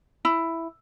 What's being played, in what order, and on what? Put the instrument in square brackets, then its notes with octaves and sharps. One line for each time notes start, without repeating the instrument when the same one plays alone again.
[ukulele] E4